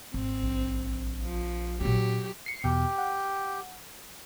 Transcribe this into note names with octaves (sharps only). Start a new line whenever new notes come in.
G#1 C4
A#1
F3
A#2 F#3 C#4 G4
C7 C#7
E2 B2 G4 G5
F#5